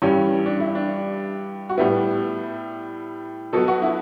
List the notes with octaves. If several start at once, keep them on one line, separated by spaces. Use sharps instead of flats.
G2 E3 G3 C#4
D4
E4
D4
F#4
A2 G3 B3 E4
B2 F#3 B3 A4
F#4
E4